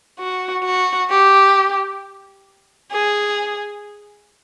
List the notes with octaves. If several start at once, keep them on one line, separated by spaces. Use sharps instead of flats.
F#4
F#4
G4
G#4